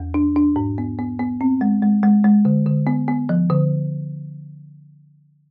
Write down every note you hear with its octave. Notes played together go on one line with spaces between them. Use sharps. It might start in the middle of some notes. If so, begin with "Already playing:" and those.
Already playing: E2
D4
D4
G#2
B3
B3
B3
C4
G#3
G#3
G#3
G#3
D3
D3
B3
B3
F3
D3